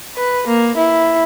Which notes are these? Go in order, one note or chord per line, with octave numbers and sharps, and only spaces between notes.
B4
A#3
E4